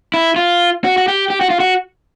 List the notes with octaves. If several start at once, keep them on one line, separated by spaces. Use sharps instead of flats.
E4
F4
F#4
F#4
G4
G4
F#4
F4
F#4